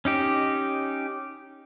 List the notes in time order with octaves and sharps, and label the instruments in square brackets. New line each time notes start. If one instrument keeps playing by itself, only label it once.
[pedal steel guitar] C#4 D#4 G4